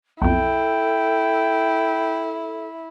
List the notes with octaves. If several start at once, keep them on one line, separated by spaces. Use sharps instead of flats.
B1 F2 E4 A4 G5